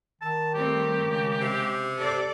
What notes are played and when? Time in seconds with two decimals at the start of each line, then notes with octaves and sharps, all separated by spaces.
0.21 D#3 A5
0.54 G3 A3 C4 G4
1.01 C#3 G#3
1.41 C3
1.96 A4 D5